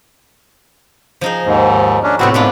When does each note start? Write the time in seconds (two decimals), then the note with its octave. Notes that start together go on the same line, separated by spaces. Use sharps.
1.21 F3 D#4 G#4
1.45 D#2 G#2
2.03 C#4 D4
2.19 A2 C3 B3 C4 E4 F#4
2.34 G#2 B3 D4 F4